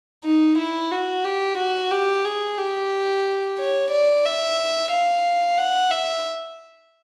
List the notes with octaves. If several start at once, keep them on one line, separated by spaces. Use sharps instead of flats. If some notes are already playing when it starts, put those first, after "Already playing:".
D#4
E4
F#4
G4
F#4
G4
G#4
G4
C#5
D5
E5
F5
F#5
E5